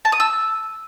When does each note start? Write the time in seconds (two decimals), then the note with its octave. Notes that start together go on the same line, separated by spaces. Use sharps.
0.05 A5
0.12 D#6
0.20 E6